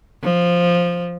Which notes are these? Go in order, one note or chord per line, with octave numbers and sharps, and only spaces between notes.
F3